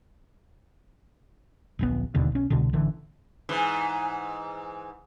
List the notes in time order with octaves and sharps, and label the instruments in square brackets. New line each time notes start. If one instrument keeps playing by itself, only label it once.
[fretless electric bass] D1 A#1 B3
E1 D#2 B2 D3
B1 C#4
C2 B2 D3
A1 D3 E3
[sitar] G#2 E3